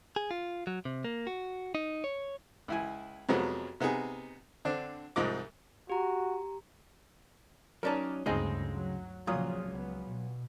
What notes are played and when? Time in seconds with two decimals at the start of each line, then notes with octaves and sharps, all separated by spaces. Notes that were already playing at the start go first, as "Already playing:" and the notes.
0.16 G#4
0.31 F4
0.67 F#3
0.85 C3
1.04 A#3
1.27 F#4
1.75 D#4
2.04 C#5
2.68 C#2 E4 G#5
3.29 F2 C3 F3 F#3 G#3 B3
3.80 C3 B3 D#4 G#4
4.65 D3 C4 D4
5.16 C2 G#2 F3 D#5 D6
5.90 F#4 G4 A#5
7.83 F#3 C#4 D#4 A#4 D5 A5
8.26 D2 G2 C#3 G#3 C4 D#4 G#4 C5
8.74 F#3
9.27 A#2 C#3 F3 F#3 F4 D#6
9.69 C#2 B3
10.08 B2